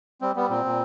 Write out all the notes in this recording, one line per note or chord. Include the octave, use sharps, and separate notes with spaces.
G3 C4
G3 B3
A#2 C4
A#2